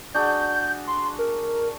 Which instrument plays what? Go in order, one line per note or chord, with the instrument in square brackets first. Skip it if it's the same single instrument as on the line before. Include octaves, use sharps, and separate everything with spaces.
[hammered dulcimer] D4 F#4 G#4 [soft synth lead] G6
[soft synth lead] C6
A#4